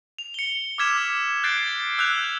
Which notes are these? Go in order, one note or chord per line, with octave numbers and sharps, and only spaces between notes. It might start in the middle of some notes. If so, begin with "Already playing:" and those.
F7
C#7 G7
D6 E6 F6 G#6 B6 E7
F#6 G6 A6 C7 D7
E6 F#6 G6 F7